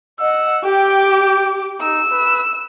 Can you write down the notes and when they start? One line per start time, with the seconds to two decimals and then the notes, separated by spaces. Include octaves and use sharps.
0.19 D#5 F#5 E6
0.64 G4 G5 D6
1.81 D#4 E6
2.12 B4